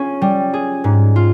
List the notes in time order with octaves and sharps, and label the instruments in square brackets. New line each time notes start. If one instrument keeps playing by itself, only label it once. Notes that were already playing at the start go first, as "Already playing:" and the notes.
Already playing: [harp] C#4 F4 G#4
G3
G#4
G#2
F4